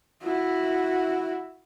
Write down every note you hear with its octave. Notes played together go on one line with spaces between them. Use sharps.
E4 F#4